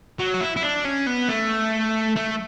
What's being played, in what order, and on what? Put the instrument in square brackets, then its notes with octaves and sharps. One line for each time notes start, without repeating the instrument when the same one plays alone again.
[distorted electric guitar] F#3
F#4
E4
E4
D4
C#4
B3
A3
A3